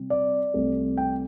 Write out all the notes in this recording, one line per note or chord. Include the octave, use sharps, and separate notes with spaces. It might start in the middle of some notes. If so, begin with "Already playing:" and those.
Already playing: C3 G3 C4
D5
C2 C3 A3
G5